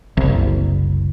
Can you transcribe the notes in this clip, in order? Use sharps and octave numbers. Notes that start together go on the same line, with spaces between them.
F#1 C2